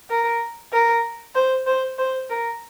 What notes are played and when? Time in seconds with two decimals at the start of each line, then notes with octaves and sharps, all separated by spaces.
0.10 A#4
0.73 A#4
1.35 C5
1.66 C5
1.98 C5
2.30 A#4